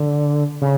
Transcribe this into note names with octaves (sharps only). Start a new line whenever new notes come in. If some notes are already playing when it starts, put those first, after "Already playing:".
Already playing: D3
C#3